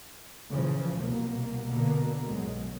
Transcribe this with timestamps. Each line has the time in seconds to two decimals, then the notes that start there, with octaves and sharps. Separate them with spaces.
0.51 A#2 C#3 E3 F3
0.98 C2 B2 A#3
1.66 B2 D3 A#3 B3
2.26 B1 F#2 G#3